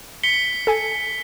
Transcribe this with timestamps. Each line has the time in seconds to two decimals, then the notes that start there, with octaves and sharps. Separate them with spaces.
0.23 B6 C#7 G7
0.67 A4 G#5